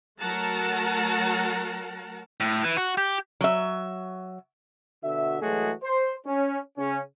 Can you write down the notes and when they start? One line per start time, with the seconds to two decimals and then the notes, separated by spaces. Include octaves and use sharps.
0.19 F#3 A3 A#4 F#5 A5 A#5
2.40 A2
2.63 E3
2.77 F#4
2.97 G4
3.41 F#3 E5
5.04 B2 D3 F#4 E5
5.42 E3 F#3 G#3 A3 F#4 G#4
5.83 C5
6.27 C#4
6.78 C#3 C#4